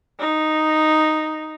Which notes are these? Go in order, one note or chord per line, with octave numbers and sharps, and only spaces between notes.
D#4